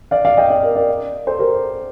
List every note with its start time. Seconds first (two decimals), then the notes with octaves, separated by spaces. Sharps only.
0.11 D5 F5
0.25 D5 F5
0.37 D#5 G5
0.50 D5 F5
0.63 A#4 D5
0.75 A#4 D5
1.27 A4 C5
1.39 G4 A#4